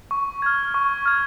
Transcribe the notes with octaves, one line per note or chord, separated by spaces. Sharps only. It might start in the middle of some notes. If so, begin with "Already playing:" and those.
C#6
F6 G#6
C#6
F6 G#6